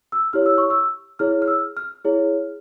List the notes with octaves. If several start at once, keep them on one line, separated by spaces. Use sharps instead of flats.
E6
E4 G4 C#5 F6
E6
C#6
E6
E4 G#4 C#5 F6
F6
E6
F6
E4 G#4 C#5